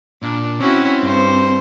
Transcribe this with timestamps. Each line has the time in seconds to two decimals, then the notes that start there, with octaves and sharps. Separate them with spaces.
0.22 A#2 D4
0.60 C4 C#4 E4 F#4
1.02 G2 C5